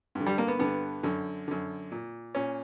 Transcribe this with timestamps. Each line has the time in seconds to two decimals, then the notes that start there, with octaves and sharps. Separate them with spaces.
0.15 G2
0.20 D3
0.26 G3
0.38 A#3
0.48 B3
0.59 G2 D3 B3
1.03 F#2 D3
1.48 F#2 D3
1.91 A#2
2.35 A#2 C#4